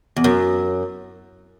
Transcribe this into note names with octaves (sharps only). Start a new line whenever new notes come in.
E2
F#2